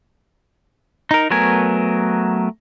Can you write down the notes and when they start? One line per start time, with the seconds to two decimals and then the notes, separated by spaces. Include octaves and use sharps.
1.11 D#4 A#4
1.31 F#3 A3 B3 A#4 G#5